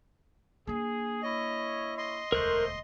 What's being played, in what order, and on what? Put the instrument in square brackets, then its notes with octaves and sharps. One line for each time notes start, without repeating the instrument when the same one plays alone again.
[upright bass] A#3 D4 [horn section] G#4
[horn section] E4 C#5 [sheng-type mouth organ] D#5
[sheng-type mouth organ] D#5 C6
[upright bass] E1 D2 [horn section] A3 C5 [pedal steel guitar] A#4 F#6